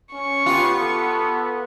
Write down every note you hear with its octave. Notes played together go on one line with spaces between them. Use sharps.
C#4 C#6
B3 F4 G4
A4